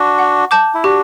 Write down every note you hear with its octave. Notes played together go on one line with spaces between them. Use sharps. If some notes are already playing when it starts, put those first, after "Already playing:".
Already playing: D4 F#4
F#5
A5 D6 G6
E4
D4 F#4 G4